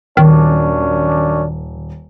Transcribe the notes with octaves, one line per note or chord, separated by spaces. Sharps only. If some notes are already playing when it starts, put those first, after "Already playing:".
D#1 F#2 D#3 C#4 D4